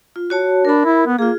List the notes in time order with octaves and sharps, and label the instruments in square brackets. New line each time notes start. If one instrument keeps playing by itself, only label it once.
[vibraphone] F4
F#4 C#5 A5
[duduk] D4 [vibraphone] A#4 B5
[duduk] E4
B3
[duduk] A#3 [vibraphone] F4 G#4